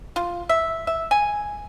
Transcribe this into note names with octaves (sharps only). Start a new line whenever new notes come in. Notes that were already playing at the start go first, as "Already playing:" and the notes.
F4
E5
E5
G#5